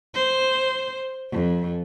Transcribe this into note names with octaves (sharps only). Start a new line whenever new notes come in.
C5
F2